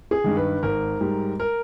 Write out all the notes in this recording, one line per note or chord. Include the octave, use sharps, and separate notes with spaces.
G#4
G2 D#3
B4
G#1 A#4
G#2 G3
A#4